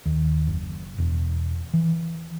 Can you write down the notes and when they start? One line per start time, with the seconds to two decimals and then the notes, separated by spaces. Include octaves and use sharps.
0.06 D#2
0.47 F#1
0.98 E1
1.73 E3